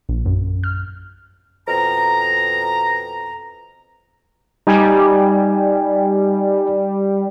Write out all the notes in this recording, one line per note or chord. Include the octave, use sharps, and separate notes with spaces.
A#1
F#2
F6
F2 B2 A#5
G3 D#4 G4 G#5